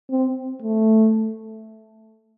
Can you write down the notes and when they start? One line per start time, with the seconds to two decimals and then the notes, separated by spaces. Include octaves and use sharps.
0.10 C4
0.62 A3